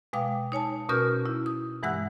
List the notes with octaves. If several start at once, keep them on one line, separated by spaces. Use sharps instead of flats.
B2 G#3 F5 G5 D6 D#6
D#4 C#5 G#5 A5
B2 C#4 F#4 A#4 F6 G6
E4
D#6
G2 E3 G#3 F#5 E6 F#6